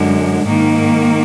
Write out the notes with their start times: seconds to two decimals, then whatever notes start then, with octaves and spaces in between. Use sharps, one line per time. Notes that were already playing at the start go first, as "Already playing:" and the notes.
Already playing: F#2 D3 G#3
0.44 G#2 D#3 A#3